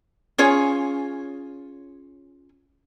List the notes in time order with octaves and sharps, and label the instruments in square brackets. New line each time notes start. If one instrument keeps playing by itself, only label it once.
[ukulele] C#4 F4 G#4 C#5